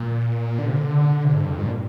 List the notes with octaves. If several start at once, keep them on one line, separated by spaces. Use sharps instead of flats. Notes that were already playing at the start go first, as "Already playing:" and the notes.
Already playing: A#2
D3
C3
D3
C3
G#2
G2
F2
G2
A#2